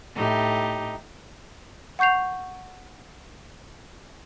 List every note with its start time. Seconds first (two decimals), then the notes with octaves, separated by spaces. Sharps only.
0.15 A2 D#4 G4
1.99 F#5 C#6 G6 C7 F7